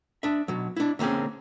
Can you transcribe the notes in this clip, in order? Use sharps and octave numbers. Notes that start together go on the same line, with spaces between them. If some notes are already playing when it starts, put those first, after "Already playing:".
D4 E5
B2 F#3
D4 E4
D3 A#3 C4 C#4 G#4